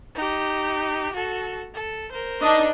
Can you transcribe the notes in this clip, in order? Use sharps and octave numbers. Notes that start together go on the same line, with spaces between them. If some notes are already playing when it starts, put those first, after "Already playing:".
D#4 G4
F#4 A4
A4
A#4 C5
D4 D#4 D#5